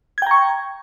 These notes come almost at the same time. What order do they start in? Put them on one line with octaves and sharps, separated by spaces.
G#6 G5 A#5 C#6